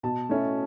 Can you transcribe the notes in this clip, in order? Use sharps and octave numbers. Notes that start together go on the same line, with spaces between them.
B2 A5
A3 C#4 E4